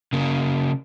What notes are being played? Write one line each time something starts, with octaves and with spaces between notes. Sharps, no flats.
C#3 A#3